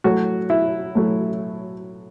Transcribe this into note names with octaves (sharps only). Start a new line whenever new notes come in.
A2 F#3 A3 F#4
E4
A2 F#3 A3